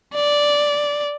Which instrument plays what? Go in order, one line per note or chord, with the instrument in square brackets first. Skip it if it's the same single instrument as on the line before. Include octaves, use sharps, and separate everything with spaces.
[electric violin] D5